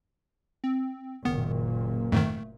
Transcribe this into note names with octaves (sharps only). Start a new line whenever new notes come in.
C4
F#1 A#2 D#3 B3
F2 G#2 D#3 A3